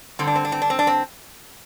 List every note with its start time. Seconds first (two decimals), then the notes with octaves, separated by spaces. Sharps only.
0.19 G2 D3 C4
0.27 D4
0.36 C4
0.45 D4
0.52 C4
0.62 D4
0.70 C4
0.79 D4
0.87 C4